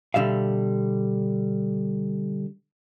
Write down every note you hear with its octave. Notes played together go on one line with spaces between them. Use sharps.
B2 D3 G3 E5 F5